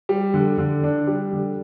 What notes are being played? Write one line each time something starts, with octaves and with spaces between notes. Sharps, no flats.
G3
D3
D3
D4
G3
D3